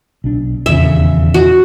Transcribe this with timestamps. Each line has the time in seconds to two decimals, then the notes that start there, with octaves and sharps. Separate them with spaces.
0.24 B1 D4
0.66 D#1 E2 C#3 E5
1.34 F#4